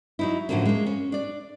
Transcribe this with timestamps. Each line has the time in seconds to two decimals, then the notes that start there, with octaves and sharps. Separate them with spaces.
0.19 F#3 D#4 E4
0.49 A2 D3 F3 F#3 A#3 C#4
0.65 G#3 A#3
0.86 C#4
1.12 D4 D5